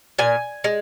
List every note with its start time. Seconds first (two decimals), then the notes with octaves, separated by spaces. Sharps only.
0.19 A#2 G#5
0.64 G#3